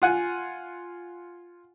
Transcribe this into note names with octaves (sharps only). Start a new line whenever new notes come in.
F4 F#5 G#5